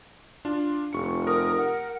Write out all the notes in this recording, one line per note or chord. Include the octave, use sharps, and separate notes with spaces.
D4 F4
F1 C#6 C#7
A#4 D#6
F#5